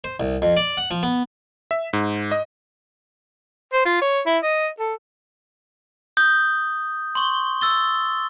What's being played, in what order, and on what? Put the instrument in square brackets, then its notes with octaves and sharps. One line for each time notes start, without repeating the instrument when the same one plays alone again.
[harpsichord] C5
C2
F2
D5
F#5
F3
B3
[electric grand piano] E5
G#2
D#5
[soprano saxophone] C5
F4
C#5
E4
D#5
A4
[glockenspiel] D#6 [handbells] G6
[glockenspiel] C6 C#6 G7
E6 A6 G7